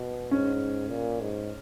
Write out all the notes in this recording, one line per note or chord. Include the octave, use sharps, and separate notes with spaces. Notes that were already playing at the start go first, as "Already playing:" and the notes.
Already playing: B2
G#2 C#4
A#2
G#2